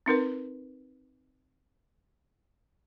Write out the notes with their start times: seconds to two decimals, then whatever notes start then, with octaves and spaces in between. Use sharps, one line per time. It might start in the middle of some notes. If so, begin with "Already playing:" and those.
0.06 C4 D#4 A#4 B4